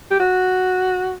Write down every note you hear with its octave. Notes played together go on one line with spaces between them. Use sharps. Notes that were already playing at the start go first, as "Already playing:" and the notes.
G4
F#4